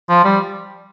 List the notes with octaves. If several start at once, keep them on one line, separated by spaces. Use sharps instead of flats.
F3
G3